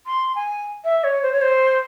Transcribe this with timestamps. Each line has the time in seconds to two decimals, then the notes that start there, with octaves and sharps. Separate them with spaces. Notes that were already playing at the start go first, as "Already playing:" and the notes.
0.06 C6
0.35 G#5
0.85 E5
1.04 C#5
1.23 C5
1.33 C#5
1.42 C5